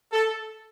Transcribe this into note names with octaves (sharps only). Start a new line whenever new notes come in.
A4